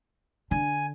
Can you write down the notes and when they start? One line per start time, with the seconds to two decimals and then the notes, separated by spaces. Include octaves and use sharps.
0.51 D3 G#5